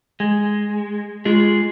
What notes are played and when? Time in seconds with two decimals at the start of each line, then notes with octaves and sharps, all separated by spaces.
0.20 G#3
1.25 G#3 F4 G#4